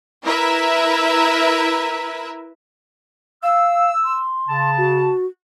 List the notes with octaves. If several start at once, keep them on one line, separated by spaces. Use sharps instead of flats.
E4 A#4 B4 E5
F5 E6
C6
C#3 A5
F#4